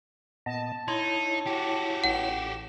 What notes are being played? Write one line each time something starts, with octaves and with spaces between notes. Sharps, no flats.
A#2 B3 D#5 A5
D#4 E4 C#5 C6
F#4 G4
A1 F#5 E7